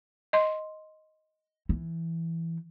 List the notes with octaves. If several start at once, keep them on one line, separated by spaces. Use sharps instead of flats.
D#5 C6
E3